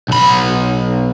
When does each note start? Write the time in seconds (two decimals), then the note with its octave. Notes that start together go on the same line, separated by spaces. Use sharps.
0.08 B1 B5